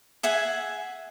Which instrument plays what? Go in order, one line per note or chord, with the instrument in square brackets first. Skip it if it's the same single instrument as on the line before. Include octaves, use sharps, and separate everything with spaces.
[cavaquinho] G#4 E5 F#5 G#5